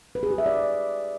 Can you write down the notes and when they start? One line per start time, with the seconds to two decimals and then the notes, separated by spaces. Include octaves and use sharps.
0.15 B4
0.23 G#4
0.31 G4
0.38 E5
0.46 D5